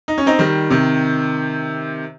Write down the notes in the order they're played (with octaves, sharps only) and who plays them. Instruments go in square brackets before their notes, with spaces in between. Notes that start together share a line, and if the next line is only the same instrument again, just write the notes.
[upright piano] D#4
C#4
C4 D#4
D#3 G3
C3 D#3